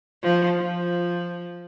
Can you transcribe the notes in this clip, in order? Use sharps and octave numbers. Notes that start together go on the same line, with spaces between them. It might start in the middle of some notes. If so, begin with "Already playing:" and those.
F3
F3